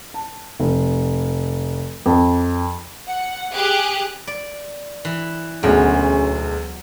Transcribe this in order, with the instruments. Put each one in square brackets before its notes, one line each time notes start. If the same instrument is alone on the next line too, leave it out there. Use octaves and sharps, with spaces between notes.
[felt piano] A5
F1
F2
[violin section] F#5
G4 G#4 F#6
[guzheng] D5
E3
[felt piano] E1 D2 G#4 [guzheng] F#3 [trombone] C#4